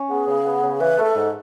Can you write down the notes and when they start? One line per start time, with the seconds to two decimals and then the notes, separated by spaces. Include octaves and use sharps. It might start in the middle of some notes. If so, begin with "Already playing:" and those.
Already playing: C#4
0.09 B3 G#4
0.27 C#3
0.45 B3
0.63 C#3
0.81 E3 B4
0.98 A3
1.04 A4
1.15 G#2